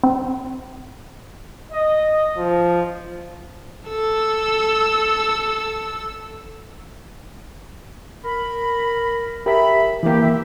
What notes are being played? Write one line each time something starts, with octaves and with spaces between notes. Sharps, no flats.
C4
D#5
F3
A4 E6
A#4 B5
G4 A#4 E5 B5
E3 A#3 G4
E5